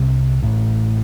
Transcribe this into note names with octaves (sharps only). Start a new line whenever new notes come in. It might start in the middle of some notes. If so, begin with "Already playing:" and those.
Already playing: C2 C3
A1 A2